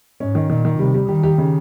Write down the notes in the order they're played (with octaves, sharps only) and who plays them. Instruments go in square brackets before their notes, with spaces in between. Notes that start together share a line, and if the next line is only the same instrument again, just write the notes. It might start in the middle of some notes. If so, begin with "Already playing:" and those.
[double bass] G#2 [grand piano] C#4
[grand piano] D#3
[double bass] A#2 [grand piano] D#3
[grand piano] D#3
[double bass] C3 [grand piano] G3
[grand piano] G3
[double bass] D#3 [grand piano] G4
[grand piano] G4
C#3